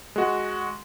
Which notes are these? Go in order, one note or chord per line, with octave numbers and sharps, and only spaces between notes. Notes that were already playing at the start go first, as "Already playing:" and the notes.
G#3 F#4